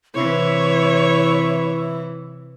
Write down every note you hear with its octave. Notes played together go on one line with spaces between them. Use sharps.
C3 E3 E4 C#5